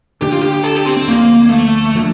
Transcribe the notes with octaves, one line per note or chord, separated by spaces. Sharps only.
D2 D3 A3 D4 G4
F4
G4
G4
A4
G4
C4
C4
D2 D3 F3 A#3
A3
F3 A#3 D4